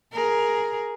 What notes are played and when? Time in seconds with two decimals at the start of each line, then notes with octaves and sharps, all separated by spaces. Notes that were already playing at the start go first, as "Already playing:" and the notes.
0.12 G#4 A#4